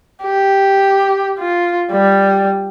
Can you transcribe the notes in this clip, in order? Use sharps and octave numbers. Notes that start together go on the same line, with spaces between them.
G4
F4
G3